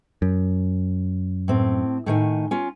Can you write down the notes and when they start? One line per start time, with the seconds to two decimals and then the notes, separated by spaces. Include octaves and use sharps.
0.22 F#2
1.48 A2 C4
2.06 A2 D#3 G#5
2.51 C#4 F4